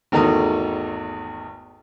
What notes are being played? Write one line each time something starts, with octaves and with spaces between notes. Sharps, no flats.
G#1 E2 D#3 A3 A#5 D#6